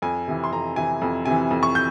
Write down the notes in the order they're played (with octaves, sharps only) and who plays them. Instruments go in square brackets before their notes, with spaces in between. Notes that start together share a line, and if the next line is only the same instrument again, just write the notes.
[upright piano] F2 G#5
C3 E3
C6
F2 A#5
C3 E3 G#5
F2
C3 E3 G#5
F2
C#6
G6